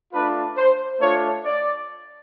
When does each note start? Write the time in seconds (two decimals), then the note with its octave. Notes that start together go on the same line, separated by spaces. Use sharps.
0.13 A3 D4 F4 B4
0.57 C5
1.01 A3 D4 F4 C#5
1.45 D5